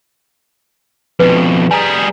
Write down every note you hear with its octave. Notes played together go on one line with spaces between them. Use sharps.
F2 B2 B4
G3 G#4 G#5 A#5